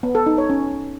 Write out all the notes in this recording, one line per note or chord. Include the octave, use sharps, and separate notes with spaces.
B3
A4
D#4
C#5
C#4